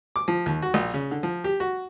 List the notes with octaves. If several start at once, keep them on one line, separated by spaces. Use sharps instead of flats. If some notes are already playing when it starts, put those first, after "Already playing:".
D6
F3
D#2
F#4
A#1
C#3
D3
F3
G4
F#4